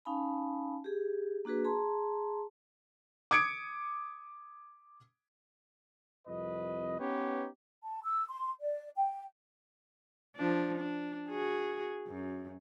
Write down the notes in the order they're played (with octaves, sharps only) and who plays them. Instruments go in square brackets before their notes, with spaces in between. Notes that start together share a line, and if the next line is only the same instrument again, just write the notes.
[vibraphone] C#4 D#4 F5 G#5 A5 B5
G4 G#4
A#3 D4 F#4 G#4 B4
G#4 A5 A#5 C6
[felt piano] D6 D#6 G#6 C#7 D7
[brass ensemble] C2 F2 B4 D#5
B3 C#4 D#4 G4 B4 C#5
[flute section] A5
E6
C6
D5
G5
[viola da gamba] F3 D4
D4
F#4 G#4
F#2